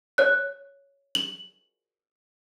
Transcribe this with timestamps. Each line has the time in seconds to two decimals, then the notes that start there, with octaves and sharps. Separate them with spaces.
0.18 C#5 F#6
1.15 F#7